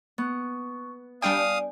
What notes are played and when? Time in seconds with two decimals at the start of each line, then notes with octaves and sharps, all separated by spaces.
0.18 B3 C#6
1.22 G3 D4 D5 F5 G5 G#5 D#6